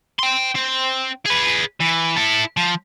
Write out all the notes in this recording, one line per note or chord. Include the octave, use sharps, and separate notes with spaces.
G5 C6
C4
G#4 B4
E3
E4 A4
F3